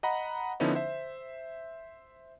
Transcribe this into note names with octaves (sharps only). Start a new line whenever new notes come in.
D#5 F#5 A#5 B5
D3 F3 B3 C#4 D#4 E4
C5 E5